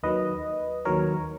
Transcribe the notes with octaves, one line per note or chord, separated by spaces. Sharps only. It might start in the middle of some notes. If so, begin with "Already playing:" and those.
D#2 D#3 F#3 B4 D#5
D#2 D#3 F#3 A#4 C#5